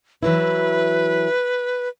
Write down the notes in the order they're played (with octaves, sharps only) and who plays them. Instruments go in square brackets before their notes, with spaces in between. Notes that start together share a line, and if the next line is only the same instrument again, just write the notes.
[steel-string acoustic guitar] E3 F#3 E4 [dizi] B4